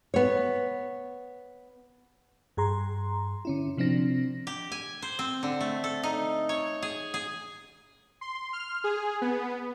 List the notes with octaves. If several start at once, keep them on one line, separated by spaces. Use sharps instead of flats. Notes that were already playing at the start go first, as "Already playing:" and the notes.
B3 C#5
G2 G#4 A#5 C6
D3 C#4 E4
C3 F3 C4 D4 A#6
G4
G#5
C5
C4
D3
A3
A4
D#4
C#5
G#4
G#4
C6
F6
G#4
B3